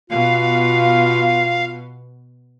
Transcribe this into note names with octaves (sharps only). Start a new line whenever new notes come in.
B2 B3 F4 F5